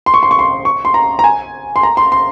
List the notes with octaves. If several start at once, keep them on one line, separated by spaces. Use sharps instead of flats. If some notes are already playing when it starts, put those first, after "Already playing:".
C6
C#6
C6
C#6
C6
C#6
C6
A#5
A#5
G#5
C6
A#5
C6
C6